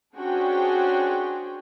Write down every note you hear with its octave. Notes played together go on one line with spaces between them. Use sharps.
C#4 D4 F#4 G#4 C5 G5